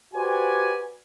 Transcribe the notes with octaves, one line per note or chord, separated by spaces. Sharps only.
F#4 G4 B4 C5 D5 G#5